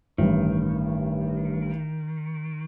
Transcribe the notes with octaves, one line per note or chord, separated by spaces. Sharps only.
A1 G2 D#3